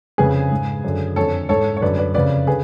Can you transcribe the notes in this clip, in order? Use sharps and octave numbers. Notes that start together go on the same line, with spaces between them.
F2 C#3 G#4 B4
G#2
F#2 D3
F2 D3 A4 C#5
G#2 A4 C#5
C#5
F#2 D3 B4 D5
B4 D5
F2 C#3 B4 D5
D3 G#4 B4